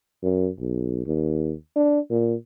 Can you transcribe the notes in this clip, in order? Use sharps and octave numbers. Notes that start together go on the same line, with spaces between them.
F#2
B1
D#2
D4
A#2